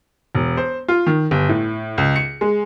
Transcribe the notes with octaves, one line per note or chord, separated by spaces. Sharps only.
E1
C5
F4
D#3
G1
A2
C#2
C#7
G#3